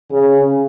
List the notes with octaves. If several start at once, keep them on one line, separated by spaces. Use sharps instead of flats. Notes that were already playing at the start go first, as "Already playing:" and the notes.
C#3